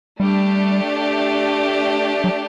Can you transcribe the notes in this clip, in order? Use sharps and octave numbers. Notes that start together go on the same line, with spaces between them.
G3 A3 D4 G4
F#3